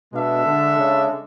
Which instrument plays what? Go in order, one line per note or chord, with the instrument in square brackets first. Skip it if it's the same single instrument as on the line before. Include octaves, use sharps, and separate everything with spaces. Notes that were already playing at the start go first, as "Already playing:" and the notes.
[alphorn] B2 [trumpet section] G#3 D4 A4 E5
[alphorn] D3
C#3